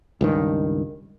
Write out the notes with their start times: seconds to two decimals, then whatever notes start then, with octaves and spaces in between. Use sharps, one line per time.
0.21 C#2 G2 D#3